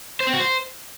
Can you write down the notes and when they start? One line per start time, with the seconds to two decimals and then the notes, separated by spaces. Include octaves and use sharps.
0.20 C5
0.27 C4
0.33 F#4
0.40 C5